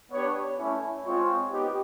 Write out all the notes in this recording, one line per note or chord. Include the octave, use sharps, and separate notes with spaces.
B3 D4 G4 C#5
A3 C#4 E4
G#3 C4 F4 C#5
B3 D#4 G4